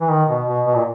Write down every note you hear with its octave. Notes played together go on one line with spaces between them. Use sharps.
E3
D#3
B2
B2
B2
A#2